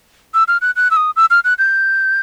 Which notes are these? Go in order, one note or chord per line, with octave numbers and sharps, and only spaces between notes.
E6
F6
F#6
F#6
E6
D#6
E6
F6
F#6
G6